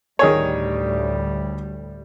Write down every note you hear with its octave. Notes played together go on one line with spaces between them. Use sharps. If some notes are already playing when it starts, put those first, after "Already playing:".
D2 A2 D#3 G3 G#4 C#5